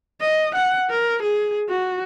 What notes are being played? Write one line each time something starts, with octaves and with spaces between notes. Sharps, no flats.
D#5
F#5
A#4
G#4
F#4